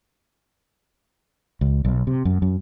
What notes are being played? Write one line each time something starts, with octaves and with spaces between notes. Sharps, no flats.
C#2
B1
C3
F#2
F#2